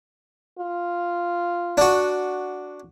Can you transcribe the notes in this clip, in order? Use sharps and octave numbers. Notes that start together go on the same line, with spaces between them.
F4
D4 F#4